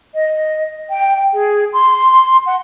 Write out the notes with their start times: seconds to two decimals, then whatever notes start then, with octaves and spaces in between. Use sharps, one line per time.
0.14 D#5
0.90 G5
1.34 G#4
1.73 C6
2.46 F#5